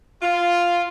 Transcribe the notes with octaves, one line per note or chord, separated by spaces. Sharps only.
F4